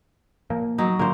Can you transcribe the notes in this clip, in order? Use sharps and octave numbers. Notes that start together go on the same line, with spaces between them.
A#2 F3 A#3
F#3 D#4
A#2 D3 A#3 C5